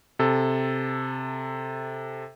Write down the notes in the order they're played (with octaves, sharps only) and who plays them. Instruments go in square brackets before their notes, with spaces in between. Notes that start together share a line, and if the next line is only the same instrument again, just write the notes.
[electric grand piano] C3 A4